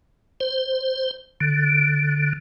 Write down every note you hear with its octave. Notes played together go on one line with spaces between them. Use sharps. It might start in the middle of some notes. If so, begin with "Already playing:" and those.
C5
D3